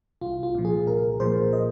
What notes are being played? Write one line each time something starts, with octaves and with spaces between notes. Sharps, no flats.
C2 F4
F4
A#2 F3
G#4
C2 A#4
A#2 F3 C5
D#5